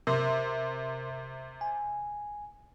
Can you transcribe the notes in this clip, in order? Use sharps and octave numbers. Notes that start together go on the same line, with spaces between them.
C3 A#4 C6
G#5